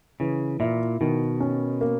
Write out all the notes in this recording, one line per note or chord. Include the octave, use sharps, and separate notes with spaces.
C#3 E3
A#2 E4
B2 D#3
C#4
A#3